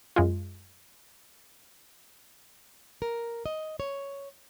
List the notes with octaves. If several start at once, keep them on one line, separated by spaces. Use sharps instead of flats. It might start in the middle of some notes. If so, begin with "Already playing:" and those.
F#2 G#3 F4
A#4
D#5
C#5